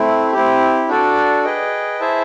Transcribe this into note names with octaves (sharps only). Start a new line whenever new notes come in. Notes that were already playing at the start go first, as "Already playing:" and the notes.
Already playing: A3 C4 E4
C4 E4 G4
D4 F#4 A4 D5
G#4 B4 D#5 G5
E4 G#4 C5 E5 A5